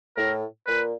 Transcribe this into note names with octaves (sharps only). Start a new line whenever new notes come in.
A2 A#4
A#2 B4